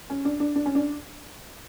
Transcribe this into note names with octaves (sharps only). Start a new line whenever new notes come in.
C#4
D4
D4
D4
C#4
D4